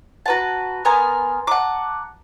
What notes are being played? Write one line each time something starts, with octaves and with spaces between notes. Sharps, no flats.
F#4 B4 F#5 A5 A#5
B3 A#4 G#5 A#5 C6
F#5 A5 A#5 D6